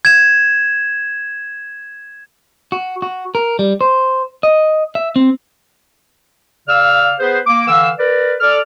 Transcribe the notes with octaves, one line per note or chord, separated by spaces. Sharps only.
G#6 E7
F#4
F#4
A#4
G3
C5
D#5
E5
C4
C#3 D5 F5 E6 F6
B3 G#4 B4 C5
A#3 D6
D3 E3 F5 E6
A#4 B4 D5
A4 D5 F6